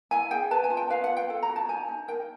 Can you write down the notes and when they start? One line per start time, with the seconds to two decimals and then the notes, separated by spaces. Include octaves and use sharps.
0.11 E4 G#5
0.31 G#4 G5
0.51 B4 A5
0.64 G#5
0.70 F4
0.77 G5
0.90 B4 F5
1.04 F#5
1.10 F4
1.17 G5
1.30 A4
1.43 A#5
1.49 F#4
1.56 A5
1.68 D#4 G#5
1.88 D#4
2.08 A#4 G5